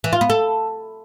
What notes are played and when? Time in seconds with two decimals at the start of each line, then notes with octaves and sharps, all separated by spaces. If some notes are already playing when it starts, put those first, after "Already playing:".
0.04 E3
0.13 F4
0.21 B3
0.30 A4